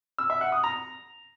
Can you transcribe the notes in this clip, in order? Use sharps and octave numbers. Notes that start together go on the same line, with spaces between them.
E6
E5
F#5
D#6
A#5